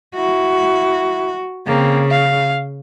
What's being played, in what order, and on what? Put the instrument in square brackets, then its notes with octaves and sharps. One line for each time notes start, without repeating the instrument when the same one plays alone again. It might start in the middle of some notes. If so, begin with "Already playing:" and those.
[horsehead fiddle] E4 [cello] F#4
[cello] C#3 [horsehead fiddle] A#3 C4
[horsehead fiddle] F5